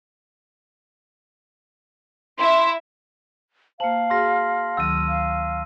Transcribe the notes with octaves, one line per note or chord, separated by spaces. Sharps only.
E4 E5 C6
A#3 C5 F5 A5 F#7
F#4 G#4 C6 F6 A#6
D2 D#3 F#3 E6 D#7
F5